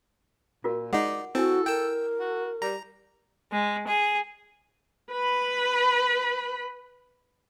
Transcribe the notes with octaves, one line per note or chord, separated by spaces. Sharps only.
A#2 F4 F#4 A#4
G#3 D#4 D5 F#5
C4 E4 F#4 A4 G#5
A#4 G5 E6
F#4
G3 A#5
G#3
G#4
B4 B5